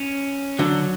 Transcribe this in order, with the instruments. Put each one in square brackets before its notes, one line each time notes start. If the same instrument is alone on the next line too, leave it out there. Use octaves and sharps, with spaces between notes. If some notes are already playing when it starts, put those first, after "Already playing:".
Already playing: [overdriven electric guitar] C#4
[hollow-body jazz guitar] D3 [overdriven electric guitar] F#3